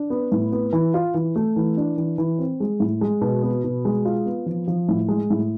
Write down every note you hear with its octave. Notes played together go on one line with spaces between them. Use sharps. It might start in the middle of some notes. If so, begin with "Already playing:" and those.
Already playing: D4
B3
A2
B3
E3
F4
E3
A3
E3
D4
E3
E3
C4
G#3
A2
G#3
B2
B3
B2
G#3
F4
B3
F3
F3
A2
G#3
A2